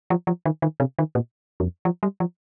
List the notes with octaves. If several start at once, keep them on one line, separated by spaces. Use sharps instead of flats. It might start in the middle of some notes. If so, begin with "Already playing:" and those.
F3
F3
D#3
D#3
C3
D#3
A#2
F2
F3
G3
F3